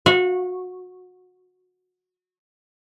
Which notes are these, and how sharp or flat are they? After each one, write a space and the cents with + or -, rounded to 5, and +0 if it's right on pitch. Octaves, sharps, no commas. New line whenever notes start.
F#4 -25 F5 +0